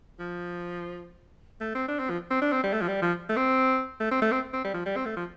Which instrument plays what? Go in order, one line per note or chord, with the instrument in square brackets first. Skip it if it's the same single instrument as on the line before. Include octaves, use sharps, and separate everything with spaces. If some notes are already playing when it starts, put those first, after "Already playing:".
[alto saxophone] F3
A3
C4
D4
C4
F3
C4
D4
C4
G3
A3
F3
G3
F3
A3
C4
A3
C4
A3
C4
C4
G3
F3
G3
C4
A3
F3